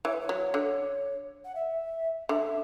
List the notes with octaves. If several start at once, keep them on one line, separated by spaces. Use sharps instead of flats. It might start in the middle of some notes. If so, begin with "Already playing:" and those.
E3 C#5
B4
C#5
F#3
D3
F#5
E5
D3 E5